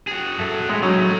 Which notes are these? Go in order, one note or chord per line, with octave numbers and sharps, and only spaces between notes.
F#4 G#4
A4 E5 A5
A2 G#3 E5
F#3 C#4 D#4
A2 A3